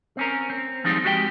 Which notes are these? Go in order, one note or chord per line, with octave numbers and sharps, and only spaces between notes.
C4 C#4 A#4
C4
F3 G3 G#3 C4 D#4
G#3 F#4 G4 E5 G5